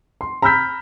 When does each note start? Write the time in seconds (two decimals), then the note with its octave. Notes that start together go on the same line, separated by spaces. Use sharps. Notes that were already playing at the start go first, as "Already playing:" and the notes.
0.21 C6
0.42 A#5 B5 E6 F6 G6 B6